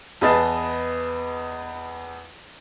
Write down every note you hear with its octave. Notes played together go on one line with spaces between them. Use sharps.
E2 G#4 B4 D#5 A5 A6